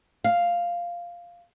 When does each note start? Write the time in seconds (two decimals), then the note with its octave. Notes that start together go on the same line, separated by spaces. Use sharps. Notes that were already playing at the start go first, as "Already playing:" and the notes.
0.24 F5